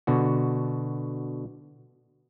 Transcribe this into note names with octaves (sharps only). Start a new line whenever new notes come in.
B2 D3 F#4